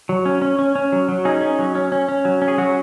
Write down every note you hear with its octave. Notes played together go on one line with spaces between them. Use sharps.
F#3
C#4
C#4
C#4
C#4
F#3
F#3
C#4 D#4 G#4
C#4
F#3
C#4
C#4
C#4
F#3
C#4
G#4
F#3 F#4